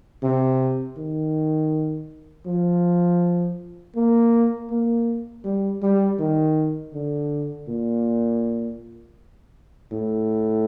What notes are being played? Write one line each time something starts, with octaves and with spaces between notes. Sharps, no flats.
C3
D#3
F3
A#3
A#3
G3
G3
D#3
D3
A#2
A2